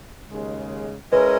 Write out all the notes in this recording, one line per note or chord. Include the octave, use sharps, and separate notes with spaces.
D#2 C#3 G#3
G#3 C#4 E4 A#4 B4